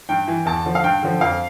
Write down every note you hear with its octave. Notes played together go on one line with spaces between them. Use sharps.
G2 G5
E3
E2 A5
D3 F3
F5
G2 G5
D3 F3
F2 F5